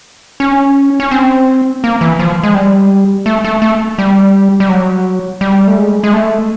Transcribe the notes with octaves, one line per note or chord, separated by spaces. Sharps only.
C#4
C#4
C4
A#3
E3
F3
G#3
G3
A3
A3
A3
G3
G3
F#3
G3
A3
G#3
G#3
A3